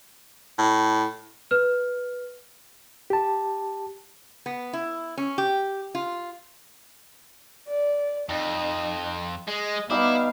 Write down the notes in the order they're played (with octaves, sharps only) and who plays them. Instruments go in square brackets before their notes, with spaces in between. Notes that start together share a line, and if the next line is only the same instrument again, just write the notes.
[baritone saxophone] A2
[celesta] B4 F6
[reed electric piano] G4 A5
[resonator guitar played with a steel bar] B3
E4
C#4
G4
F4
[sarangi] D5
[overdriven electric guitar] F2 [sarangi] D#4
[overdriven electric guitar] G#3 [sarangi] D#5
[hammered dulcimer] G3 D#4 D6 [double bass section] B3 [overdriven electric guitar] E4 [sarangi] F5